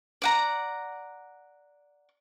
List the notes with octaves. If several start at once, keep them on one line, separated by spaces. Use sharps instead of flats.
D5 F#5 A#5